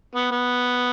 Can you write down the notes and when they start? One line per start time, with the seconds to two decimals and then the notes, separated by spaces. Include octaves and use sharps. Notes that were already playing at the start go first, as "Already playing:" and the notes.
0.15 B3
0.31 B3